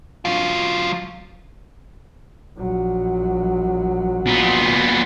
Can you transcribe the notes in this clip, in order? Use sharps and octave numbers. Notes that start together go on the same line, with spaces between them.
F#3 F4
A#1 F#3
A#2 B3